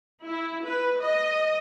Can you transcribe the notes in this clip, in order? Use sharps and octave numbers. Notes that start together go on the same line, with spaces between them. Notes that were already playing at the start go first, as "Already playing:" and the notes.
E4
B4
D#5